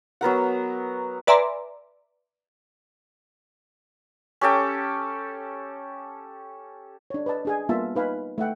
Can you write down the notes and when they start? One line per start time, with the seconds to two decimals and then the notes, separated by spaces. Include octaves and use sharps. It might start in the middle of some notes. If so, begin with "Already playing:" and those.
0.21 F#3 B3 A#4 F#5
1.27 B4 D5 E5 G#5 A#5 C6
4.41 C#4 G4 A4 G5
7.10 D4 C#5
7.26 B4 D5 D#5 A5
7.45 D4 G#4 G#5
7.69 G3 A#3 B3 F4 E5 A5
7.95 D#4 B4 F5 G#5 B5
8.38 A3 E5 F#5 G5